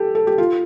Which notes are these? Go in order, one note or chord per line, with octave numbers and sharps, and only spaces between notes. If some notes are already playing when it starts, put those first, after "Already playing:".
Already playing: G4 A4
A4
G4
F4